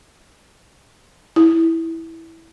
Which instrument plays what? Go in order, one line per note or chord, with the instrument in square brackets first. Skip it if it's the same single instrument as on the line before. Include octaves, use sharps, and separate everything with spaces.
[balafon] E4